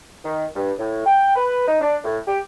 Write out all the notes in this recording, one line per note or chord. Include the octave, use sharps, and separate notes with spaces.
D#3
G2
A2
G5
B4
D#4
D4
A2
G4